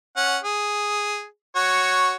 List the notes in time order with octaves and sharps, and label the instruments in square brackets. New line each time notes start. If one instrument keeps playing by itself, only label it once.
[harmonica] C#4 F#5
G#4
F#4 C#5